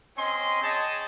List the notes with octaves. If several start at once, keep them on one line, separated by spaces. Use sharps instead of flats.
C4 C#4 D#5 G#5 C6
G#4 C#5 D#5 G5 A5